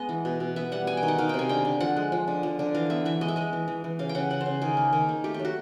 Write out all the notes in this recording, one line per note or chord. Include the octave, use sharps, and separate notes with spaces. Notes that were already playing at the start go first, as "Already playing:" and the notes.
Already playing: G#3 B3 D#5
E3
B2
B2
B3 E5
G3 F#5
B3 G#5
G5
D#3
F#5
D#3 F5
C3 G5
G#5
D3 G5
D3
F3 F#5
G#3
F3
D3
F3
D3
E3 F5
B3 E5
E3 E5
G#3 D#5
E5
G#3 D#5
E3
E3
E3
C#3 F5
G5
C#3 F#5
C#3 F#5
C5
C#3
D#3 G#4
A#3
D#3
A#3
A3 G4
G4
F#3
F#4